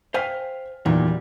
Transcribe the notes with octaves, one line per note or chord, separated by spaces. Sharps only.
C5 F5 G5 G#5 F6 B6
E2 A#2 D#3 E3 F#3 G3